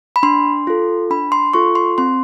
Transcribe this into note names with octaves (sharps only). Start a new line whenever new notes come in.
B5
D4 C6
F4 A4
D4 B5
C6
F4 A4 C#6
C6
C4 C6